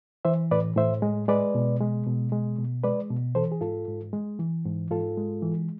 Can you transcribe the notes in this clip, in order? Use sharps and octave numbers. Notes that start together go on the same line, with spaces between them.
E3 C5 E5
A2 B4 D5
A2 C5 E5
G#3
G#3 B4 D5
B2
G#3
B2
G#3
B2
G#3 B4 D5
B2
E3 A4 C5
G#4
G#2 F4 A4
G#2
G#3
E3
G#2
G#2 F4 A4
G#3
E3